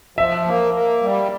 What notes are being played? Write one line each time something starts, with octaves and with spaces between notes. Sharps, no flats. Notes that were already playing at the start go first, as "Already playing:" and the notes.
F3 E5
A#3
A#3
G3